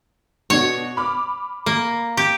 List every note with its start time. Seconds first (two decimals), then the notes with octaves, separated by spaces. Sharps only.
0.50 B2 D4 F#4 C#5
0.97 B5 D6 F6
1.66 A#3
2.17 G4